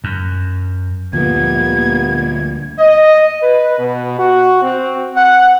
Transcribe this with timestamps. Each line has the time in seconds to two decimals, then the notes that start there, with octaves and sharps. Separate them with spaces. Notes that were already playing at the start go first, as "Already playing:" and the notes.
0.04 F#2
1.13 D2 A#2 D3 F3 G3 A#3 B3 G#6
2.79 D#5
3.41 B4
3.78 B2
4.18 F#4
4.61 C4
5.15 F#5